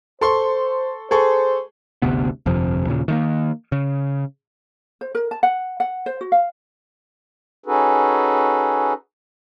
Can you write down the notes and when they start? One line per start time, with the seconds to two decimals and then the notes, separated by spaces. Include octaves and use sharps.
0.21 A4 C5 C6 C#6
1.11 G#4 A4 C5 C#6
2.02 G1 D2 C3 B3
2.46 G1 F2 C3 F3
2.87 D#2 A#2 C#3
3.08 D#3 A3 A#3
3.72 C#3
5.01 C5
5.15 A#4
5.31 A5
5.43 F#5
5.80 F#5
6.06 C5
6.21 F#4
6.32 F5
7.66 C#4 D#4 F#4 G#4 A4 B4